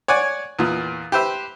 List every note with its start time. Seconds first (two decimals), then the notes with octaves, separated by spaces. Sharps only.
0.08 C#5 D5 F#5 G#5
0.59 E2 A#2
1.12 G4 B4 C5 E5